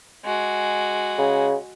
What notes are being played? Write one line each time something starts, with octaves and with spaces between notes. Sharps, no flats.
G#3 F#4
C#3